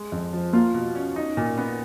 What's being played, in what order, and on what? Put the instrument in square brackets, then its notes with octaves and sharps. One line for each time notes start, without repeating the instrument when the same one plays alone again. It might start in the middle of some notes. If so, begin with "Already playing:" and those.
Already playing: [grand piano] G#3
F2
F3
[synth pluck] A#3 [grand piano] F4
[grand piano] B2
C#4
D#4
A#2
B3